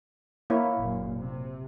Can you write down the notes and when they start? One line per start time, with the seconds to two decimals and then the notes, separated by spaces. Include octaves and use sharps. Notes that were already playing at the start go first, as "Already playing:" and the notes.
0.50 A#3 E4 C#5
0.79 F#1 A#2
1.18 C3